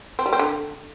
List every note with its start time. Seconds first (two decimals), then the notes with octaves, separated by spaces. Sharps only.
0.19 C4
0.26 G3
0.33 C4
0.39 D3